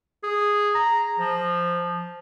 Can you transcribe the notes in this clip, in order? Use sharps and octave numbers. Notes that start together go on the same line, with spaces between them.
G#4
A#5
F3